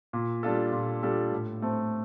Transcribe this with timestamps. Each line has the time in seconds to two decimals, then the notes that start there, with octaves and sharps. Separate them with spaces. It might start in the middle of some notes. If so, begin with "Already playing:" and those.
0.13 A#2
0.43 G3 D4 F4 A4
0.72 A#2
1.03 G3 D4 F4 A4
1.32 A2
1.62 A3 C4